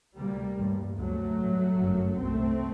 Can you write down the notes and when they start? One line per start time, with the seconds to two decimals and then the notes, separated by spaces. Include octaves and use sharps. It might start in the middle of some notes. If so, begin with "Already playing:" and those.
0.17 D2 C3 G3 A#3
0.58 A1 G2
0.98 D2 C3 F#3 A3
1.37 A1 G2
1.78 G1 F#2
2.17 C2 A#2 A3 C4